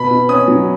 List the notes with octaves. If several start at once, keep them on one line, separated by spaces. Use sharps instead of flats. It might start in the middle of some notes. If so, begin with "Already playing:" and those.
Already playing: B2 B5
B2
C#4 D#6
F#3